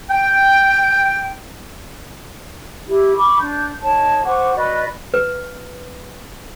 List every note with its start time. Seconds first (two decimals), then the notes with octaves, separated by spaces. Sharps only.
0.09 G5
2.87 E4 G4
3.14 B5 C#6 D6
3.40 D4 G6
3.82 D#4 C#5 A5
4.24 C5 F#5 C#6 D6
4.55 F#4 B4 D5 D#5
5.14 B4